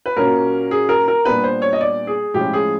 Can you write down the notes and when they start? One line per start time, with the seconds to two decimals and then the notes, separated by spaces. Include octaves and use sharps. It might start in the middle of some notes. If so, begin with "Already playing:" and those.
0.06 B4
0.17 A#2 F#3 A#3 C#4 A#4
0.71 G#4
0.89 A#4
1.08 A#4
1.25 A#2 G3 B3 D4 B4
1.44 C5
1.62 C#5
1.73 D#5
1.81 D5
2.07 G#4
2.34 A2 F3 G#3 C#4 G4
2.53 G#4